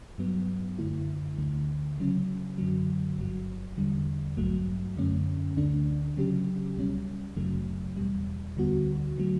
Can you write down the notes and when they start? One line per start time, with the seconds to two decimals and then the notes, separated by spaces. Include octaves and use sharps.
0.18 G2 F#3 B3
0.78 F#2 D3 A3 E4
1.38 D2 D3 A3
1.98 C#3 F#3 C#4
2.58 F#2 D3 F#3
3.18 G1 G2 F#3
3.77 E2 D3 G3
4.37 A1 G2 F#3 A3
4.97 F#2 D3 A3 C#4
5.57 D2 D3 A3 D4
6.17 C#3 F#3 C#4 G4
6.76 C#2 B2 G3 C#4
7.37 G1 F#2 C#3 F#3 A3
7.97 E2 B2 G3
8.57 D2 D3 G3 B3 F#4
9.18 D3 F#3 A3